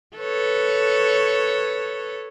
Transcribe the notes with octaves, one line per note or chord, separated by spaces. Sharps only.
A4 B4 C#5